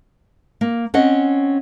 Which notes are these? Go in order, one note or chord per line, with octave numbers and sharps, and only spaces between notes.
A#3
C4 C#4 D#5 F#5